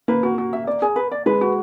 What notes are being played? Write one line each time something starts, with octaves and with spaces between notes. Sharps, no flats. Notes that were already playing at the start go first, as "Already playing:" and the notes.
A#3 B4
F#4
F#4
E5
D5
G#4
B4
D5
G#3 B4
F#4